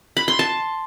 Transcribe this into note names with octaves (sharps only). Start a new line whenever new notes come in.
B5
C6
A5